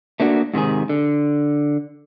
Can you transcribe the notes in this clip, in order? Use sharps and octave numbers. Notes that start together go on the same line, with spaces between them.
A3 A#3 D4 F#4
G#2 C3 D#3 G#4
D3